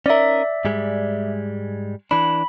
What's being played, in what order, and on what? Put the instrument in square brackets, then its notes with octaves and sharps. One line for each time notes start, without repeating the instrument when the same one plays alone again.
[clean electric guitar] C#4 D#4 A#4 [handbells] D5 E5
[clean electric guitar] G#2 G3 G#3
[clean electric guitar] E3 D4 [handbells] B5